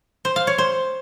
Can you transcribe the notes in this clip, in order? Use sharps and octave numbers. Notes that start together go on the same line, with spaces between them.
C5
F5
C#5
C5